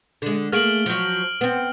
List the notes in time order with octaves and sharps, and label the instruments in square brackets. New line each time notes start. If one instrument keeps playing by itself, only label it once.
[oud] D3 G#3
[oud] A3 A#3 G#4 [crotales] F6 D7 F#7
[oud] F3 F#3
B3 C4